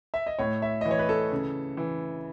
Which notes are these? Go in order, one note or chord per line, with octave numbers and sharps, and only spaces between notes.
E5
D#5
A2 C#5
E5
D#5
E3
C#5
B4
A4
C#3
E3